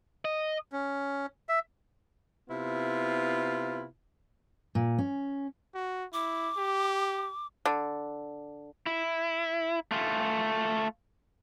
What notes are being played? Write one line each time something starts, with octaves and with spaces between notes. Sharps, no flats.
D#5
C#4
E5
C3 B3 E4 F4
A#2
C#4
F#4
E4 D6
G4
D3
E4
A3 F4